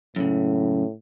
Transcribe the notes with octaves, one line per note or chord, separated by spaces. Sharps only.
F#2 A2 C#3